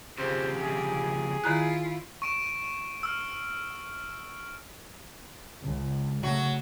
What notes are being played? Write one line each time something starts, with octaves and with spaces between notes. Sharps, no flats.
F2 C#3 G4 C5
G#4
D#3 E4 F4 A#5 F#6
C#6 D7 E7
E6 F6
C#2
C#3 F#3 A3 F#4